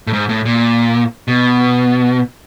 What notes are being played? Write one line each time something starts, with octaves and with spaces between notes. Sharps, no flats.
A2
G#2
A2
A#2
B2